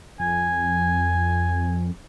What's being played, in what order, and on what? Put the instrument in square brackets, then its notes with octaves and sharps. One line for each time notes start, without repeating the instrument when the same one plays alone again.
[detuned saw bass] F2 [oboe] G#5